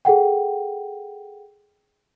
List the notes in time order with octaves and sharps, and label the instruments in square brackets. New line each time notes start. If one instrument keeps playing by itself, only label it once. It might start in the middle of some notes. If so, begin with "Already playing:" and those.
[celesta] G#4 A4 F#5 G5